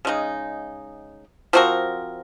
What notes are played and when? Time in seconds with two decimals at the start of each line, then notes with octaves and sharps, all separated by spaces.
0.05 C#3 G#3 D#4
1.53 F3 C4 F#4 A#4